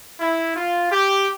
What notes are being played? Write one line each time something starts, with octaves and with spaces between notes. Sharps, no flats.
E4
F4
G4